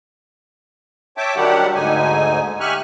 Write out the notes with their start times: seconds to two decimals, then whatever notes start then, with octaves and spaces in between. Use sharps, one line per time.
1.17 C#5 E5 G5 A5 D6
1.36 D#3 F#3 G3 D4 G4 F#5
1.75 D2 G#2 D3 D#4 G#5
2.60 G4 E5 G#5 C#6 F6 F#6